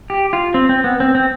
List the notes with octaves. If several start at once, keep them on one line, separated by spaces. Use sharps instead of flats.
G4
F4
C4
C4
B3
C4
C4